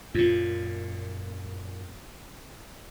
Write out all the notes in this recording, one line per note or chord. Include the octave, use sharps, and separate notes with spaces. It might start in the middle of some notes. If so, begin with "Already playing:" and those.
F#2 A#2 F4